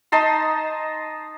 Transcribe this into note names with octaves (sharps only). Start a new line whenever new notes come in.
D#4 D#5 A5 C6